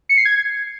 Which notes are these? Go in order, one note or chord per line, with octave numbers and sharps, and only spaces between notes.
C#7
C7
G#6